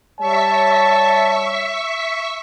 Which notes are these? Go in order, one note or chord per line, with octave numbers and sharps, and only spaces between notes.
G3 C#5 E5 A5 C#6 B6